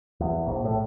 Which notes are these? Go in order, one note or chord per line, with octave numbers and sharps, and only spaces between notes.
E2
A#1
A2